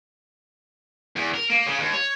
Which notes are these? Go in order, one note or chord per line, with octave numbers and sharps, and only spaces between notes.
E2
A#4
A#3
C#3
D#2
C#5